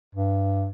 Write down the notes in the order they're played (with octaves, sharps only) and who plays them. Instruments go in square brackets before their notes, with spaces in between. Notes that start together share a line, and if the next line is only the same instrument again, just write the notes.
[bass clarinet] G2